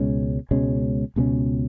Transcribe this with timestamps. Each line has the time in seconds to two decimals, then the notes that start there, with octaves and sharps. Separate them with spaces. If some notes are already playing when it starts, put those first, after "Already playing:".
Already playing: C#2 B2 G#3 C#4
0.51 C#2 B2 G#3 C#4
1.16 C#2 B2 G#3 C#4